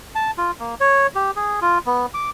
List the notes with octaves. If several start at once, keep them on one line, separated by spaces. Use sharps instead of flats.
A5
F4
A#3
C#5
G4
G#4
F4
B3
D6